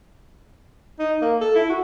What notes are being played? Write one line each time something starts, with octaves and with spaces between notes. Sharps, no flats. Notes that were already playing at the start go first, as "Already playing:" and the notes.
D#4
A#3
A4
E4
F#4